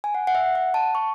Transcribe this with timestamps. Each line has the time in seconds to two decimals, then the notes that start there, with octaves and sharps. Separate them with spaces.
0.04 G#5
0.15 F#5
0.27 F#5
0.35 E5
0.55 F#5
0.74 A5
0.95 C#6